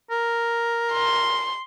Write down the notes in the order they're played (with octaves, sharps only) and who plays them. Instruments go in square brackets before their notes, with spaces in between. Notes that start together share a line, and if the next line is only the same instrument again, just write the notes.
[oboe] A#4
[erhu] C6